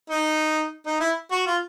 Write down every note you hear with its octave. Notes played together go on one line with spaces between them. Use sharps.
D#4
D#4
E4
F#4
F4